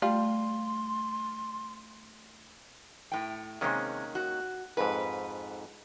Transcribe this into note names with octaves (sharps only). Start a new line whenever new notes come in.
G3 A3 F4 C6
A2 G5
C3 D#3 G#3 A#3 C#4 G#4
F#4
F2 G#2 B4